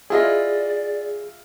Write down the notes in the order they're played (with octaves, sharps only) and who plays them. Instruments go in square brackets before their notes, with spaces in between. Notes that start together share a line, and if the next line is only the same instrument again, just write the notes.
[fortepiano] E4 F4 D#5 [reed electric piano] G#4 [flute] D5